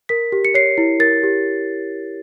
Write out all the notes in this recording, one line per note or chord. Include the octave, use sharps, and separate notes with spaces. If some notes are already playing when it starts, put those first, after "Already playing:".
A#4 B6
G4
C#7
C#5 C7
E4
A#4 A6
G4